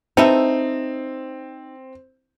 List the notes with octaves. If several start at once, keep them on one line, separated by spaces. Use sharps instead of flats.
C4 D#4 A4 B4 E5